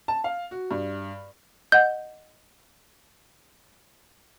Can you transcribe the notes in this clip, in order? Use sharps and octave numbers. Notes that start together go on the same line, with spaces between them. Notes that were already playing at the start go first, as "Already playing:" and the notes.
A5
F5
F#4
G2
D#5 F#5 G6